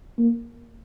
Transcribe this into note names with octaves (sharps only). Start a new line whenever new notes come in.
A#3